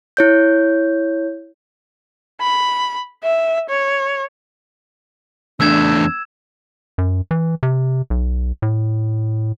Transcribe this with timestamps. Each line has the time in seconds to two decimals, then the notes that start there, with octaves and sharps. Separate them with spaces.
0.17 E4 C#5 G6
2.41 B5
3.23 E5
3.69 C#5
5.60 E2 A3 D4 E6 G#6 E7
6.98 F#2
7.31 E3
7.63 C3
8.10 B1
8.62 A2